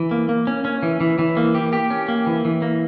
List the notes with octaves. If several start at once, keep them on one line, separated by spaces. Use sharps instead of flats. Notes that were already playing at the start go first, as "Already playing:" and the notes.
Already playing: E3
A#3
A#3
C#4
C#4
E3
E3
E3
A#3
G4
G4
C#4
A#3
E3
E3
A#3